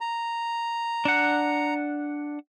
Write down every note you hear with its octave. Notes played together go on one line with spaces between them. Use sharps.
A#5
D4 F#5